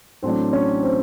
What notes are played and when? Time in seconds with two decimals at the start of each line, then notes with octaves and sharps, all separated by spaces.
0.22 A1 A2 F#3 A3 C4 D4 C5
0.53 C#4 C#5
0.83 C4 C5